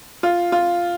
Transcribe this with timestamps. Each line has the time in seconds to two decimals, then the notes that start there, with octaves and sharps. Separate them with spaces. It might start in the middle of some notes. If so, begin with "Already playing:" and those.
0.23 F4
0.52 F4